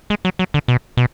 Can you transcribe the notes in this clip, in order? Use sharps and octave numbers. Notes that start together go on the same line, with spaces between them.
G#3
F#3
F#3
D3
B2
B2